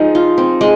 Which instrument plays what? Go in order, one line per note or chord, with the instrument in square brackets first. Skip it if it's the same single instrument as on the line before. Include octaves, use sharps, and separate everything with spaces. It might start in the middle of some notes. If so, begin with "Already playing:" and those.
Already playing: [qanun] F3 G#3 [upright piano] D#4
[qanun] F4
C4
G#3